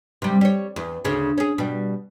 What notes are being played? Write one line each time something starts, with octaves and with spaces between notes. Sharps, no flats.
C3 G3
G3 C#5
E2
D2 C#3 C#4
C#4 G#4
B2 G3